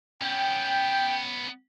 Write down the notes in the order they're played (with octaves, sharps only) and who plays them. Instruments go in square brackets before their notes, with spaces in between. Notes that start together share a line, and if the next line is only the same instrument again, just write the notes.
[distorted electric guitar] B3 C#4 [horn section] G5